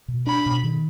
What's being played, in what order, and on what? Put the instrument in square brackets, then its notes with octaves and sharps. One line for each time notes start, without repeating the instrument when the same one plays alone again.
[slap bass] B2
[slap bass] D4 [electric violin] B5
[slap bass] B2
D#3